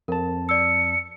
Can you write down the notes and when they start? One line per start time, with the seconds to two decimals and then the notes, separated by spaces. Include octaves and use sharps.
0.08 F2 A#4 A5
0.49 D5 E6 C#7